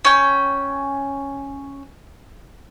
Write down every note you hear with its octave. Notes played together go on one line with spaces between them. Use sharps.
C#4 G5